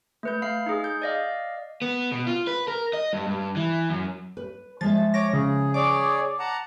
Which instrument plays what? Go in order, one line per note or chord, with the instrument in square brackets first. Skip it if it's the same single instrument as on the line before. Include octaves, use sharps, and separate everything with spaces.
[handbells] A3 B4 G6
A3 F5 C7
D#4 G#4
G6
D5 D#5 F5
[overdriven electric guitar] B3
B2
F4
B4
A#4
D#5
G2
G2
E3
F#2
[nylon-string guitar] B4
[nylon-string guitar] F3 G#3 E5 [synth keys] A6
[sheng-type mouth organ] C#5 D6 [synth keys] A#6
[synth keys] C#3 [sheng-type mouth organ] G#4
[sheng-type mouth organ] G#4 C#5 D5 [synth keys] D6
[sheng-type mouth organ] F#5 A5 A#5